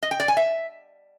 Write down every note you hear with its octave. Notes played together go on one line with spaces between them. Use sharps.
D#5
G5
D5
G#5
E5